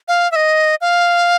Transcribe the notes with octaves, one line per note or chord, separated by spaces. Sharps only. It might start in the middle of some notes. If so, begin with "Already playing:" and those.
F5
E5
D#5
F5